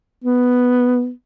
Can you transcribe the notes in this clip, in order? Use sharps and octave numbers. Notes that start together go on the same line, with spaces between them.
B3